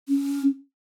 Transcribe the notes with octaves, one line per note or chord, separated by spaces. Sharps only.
C#4